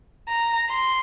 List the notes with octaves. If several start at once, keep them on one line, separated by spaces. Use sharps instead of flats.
A#5
C6